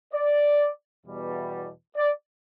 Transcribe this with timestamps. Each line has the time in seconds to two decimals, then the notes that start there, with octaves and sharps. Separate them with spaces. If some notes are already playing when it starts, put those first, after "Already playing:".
0.14 D5
1.05 E2 B2 G3
1.97 D5